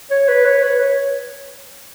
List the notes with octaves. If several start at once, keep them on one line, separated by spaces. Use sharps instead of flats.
C#5
B4
C#5
B4
C#5